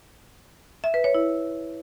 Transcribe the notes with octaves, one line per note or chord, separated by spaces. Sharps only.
E5
B4
C#5
E4